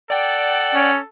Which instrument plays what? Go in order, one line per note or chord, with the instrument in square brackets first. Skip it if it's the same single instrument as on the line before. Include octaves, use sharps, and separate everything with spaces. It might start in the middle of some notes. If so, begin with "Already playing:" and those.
[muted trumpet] A4 [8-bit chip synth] D5 G5 [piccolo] F#5
[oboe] C#4